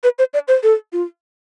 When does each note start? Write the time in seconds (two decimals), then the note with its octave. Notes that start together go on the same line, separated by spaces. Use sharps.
0.04 B4
0.19 C5
0.34 D5
0.48 C5
0.63 A4
0.93 F4